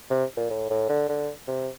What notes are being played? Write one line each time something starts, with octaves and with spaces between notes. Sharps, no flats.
C3
A#2
A2
A2
D3
D3
C3